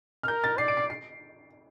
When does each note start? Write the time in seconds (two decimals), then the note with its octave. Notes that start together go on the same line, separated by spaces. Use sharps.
0.23 F6
0.28 A#4 G6
0.44 A6
0.58 D5 C7
0.68 D7
0.77 C7
0.90 C7